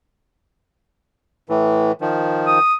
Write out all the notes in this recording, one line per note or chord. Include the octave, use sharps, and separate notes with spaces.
A2 E3
D#3 F3
D#6